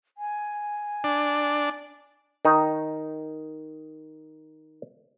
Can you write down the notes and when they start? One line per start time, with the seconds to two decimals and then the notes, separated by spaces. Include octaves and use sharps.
0.18 G#5
1.04 D4
2.45 D#3 D#4